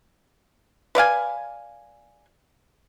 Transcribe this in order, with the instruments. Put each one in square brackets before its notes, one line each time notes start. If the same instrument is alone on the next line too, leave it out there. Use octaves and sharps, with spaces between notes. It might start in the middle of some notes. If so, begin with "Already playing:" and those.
[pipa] B4 D5 F5 G#5